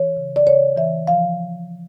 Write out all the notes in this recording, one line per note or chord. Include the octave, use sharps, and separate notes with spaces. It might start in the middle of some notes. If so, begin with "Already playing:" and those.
Already playing: E3 C#5
C#3
D5
C#3 C#5
E3 E5
F3 F5